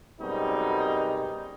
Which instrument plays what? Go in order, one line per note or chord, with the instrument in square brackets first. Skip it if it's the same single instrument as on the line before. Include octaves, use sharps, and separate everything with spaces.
[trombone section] F#2 B2 G3 G#3 C4 D#4